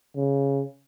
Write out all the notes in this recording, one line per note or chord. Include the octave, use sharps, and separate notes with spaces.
C#3